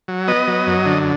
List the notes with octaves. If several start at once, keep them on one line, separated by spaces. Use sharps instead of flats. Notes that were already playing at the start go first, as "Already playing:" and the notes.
F#3
B3 D#5
F#3
F#2
D3